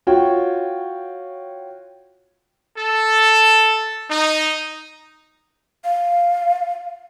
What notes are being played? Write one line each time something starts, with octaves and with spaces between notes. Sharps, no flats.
F4 F#4 C#5 G5
A4
D#4
F5